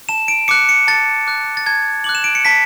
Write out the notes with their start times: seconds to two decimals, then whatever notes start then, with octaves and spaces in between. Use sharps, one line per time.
0.09 A5 E7
0.28 D7
0.48 D6 F#6 C#7
0.69 C#7
0.88 A5 A6
1.27 D6 F#6
1.57 A6
1.66 A5 G#6
2.04 D6 F#6 F#7
2.15 E7
2.24 D7
2.35 C#7
2.45 A5 B6